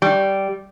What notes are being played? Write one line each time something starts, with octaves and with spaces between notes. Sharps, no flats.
G3